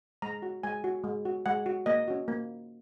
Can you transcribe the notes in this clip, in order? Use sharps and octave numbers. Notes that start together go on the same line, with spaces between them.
G#3 A#5
F#4
G#3 G#5
F#4
G#3
F#4
G#3 F#5
F#4
A#3 D#5
C#4 F#4
A#3